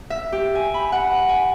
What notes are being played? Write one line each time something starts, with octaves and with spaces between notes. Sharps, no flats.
E5
G4
G#5
B5
F#5
G#5